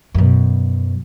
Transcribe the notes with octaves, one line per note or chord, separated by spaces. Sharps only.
F#2 B2